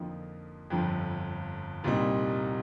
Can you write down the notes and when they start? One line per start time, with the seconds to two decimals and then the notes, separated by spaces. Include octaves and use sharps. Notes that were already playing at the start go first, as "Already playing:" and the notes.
Already playing: F2 D3 F3 A#3 D#4
0.70 G1 F2 D3 F3
1.84 C2 A#2 G3 C4 D#4